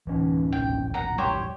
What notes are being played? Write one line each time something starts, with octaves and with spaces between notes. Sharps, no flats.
D1 E3 C#4
D#1 A1 G5
F#5 A#5
G3 G4 C5 C#5